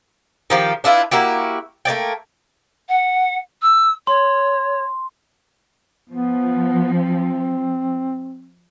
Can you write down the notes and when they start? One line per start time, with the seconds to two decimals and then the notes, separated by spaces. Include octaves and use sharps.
0.50 D#3 F3 G4
0.84 D4 E4 F4 B4
1.11 A#3 E4 F#4 G4
1.85 A3 A#3 D5 G5
2.89 F#5
3.62 E6
4.07 C#5 C6
6.10 F3 B3
6.93 C4